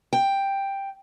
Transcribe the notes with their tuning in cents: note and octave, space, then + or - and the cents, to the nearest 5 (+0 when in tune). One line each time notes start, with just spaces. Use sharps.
G5 +5